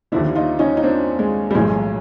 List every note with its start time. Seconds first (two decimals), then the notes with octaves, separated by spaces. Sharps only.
0.12 D#2 D3 F3 D4 E4
0.35 D#4 F4
0.59 C#4 D#4
0.77 D#4
0.83 C4 D4
1.19 G#3
1.51 G3
1.55 B1 A2 E3 G#3